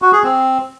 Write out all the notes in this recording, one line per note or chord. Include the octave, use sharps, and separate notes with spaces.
F#4
G#4
C4